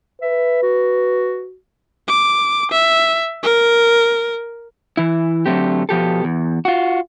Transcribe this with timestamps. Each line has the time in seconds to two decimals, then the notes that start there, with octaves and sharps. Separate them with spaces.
0.22 B4 E5
0.63 F#4
2.08 D6
2.71 E5
3.43 A#4
4.97 E3 E4
5.46 D3 F#3 A3 C4 G4
5.89 B2 F3 G4 A4
6.24 E2
6.65 F4 F#4